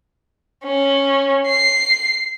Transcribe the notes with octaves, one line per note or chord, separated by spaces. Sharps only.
C#4
C7